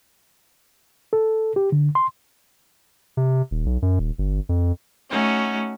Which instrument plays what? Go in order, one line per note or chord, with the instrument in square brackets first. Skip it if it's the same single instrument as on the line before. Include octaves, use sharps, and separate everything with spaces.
[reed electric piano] A4
G4
D3
C6
[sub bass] C3
D#1
B1
F#2
D#1
G1
F2
[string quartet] A3 C#4 D#4 F#4